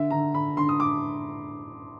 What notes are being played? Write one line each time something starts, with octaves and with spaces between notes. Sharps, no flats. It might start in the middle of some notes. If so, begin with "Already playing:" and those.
Already playing: D3 E5
D3 A#5
D3 B5
D3 C6
D#6
D6